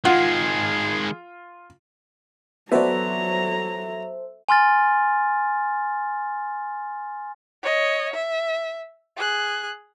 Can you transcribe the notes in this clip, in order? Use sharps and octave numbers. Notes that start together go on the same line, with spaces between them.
D#3 G#3 F4 G#4 F#5
F#3 B3 F#4 A4 C5 D5 E5 A#5
G#5 C6 F6 A6
C#5 D#5
E5
G#4 F#6